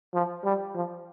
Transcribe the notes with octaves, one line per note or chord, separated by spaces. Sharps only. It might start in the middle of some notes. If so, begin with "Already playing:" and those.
F3
G3
F3